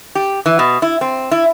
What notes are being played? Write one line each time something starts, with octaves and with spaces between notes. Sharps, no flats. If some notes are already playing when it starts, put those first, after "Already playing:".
G4
E3
B2
E4
C4
E4